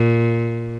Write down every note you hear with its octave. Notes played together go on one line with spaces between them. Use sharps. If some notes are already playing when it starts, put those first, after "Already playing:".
Already playing: A#2